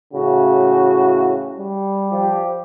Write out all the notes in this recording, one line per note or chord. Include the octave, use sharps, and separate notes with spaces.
A2 C#3 E3 F#4
G3
F3 G4